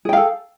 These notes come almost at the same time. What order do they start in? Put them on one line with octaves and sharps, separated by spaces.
G#4 G5 F5 A4